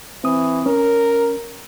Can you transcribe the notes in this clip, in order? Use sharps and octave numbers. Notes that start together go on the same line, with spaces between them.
E3 C4 D#6
C#4 A#4